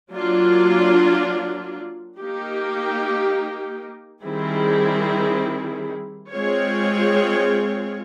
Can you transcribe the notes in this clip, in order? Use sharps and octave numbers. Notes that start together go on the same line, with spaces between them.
F#3 A#3 D4 F4
A#3 D#4 G4
D#3 G3 C4 E4 G#4
G#3 C4 F4 G#4 C#5